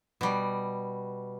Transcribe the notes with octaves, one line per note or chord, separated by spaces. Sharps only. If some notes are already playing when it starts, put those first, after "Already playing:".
B2 G3